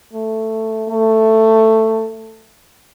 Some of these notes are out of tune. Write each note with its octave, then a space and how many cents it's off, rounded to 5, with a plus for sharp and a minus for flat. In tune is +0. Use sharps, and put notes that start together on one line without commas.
A3 +5
A3 +10